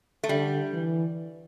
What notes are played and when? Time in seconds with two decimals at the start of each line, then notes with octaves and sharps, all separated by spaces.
0.24 A3
0.29 D3 G3
0.73 E3